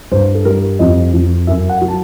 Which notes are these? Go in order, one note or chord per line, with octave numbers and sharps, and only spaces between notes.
G2 C5
A4
G3 A#4
F2 D#5
F2
F#2 E5
F#5
F#3
A5